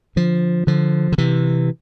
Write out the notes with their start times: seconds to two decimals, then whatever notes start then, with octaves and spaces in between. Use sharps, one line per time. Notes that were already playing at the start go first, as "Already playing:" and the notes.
0.16 D3 F3
0.67 D3 F3
1.12 D3
1.18 C3 E3